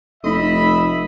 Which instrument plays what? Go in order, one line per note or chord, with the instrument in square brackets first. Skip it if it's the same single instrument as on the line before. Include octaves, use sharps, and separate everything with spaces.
[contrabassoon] F1 [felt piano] A3 D#4 [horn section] D#5 E5 B5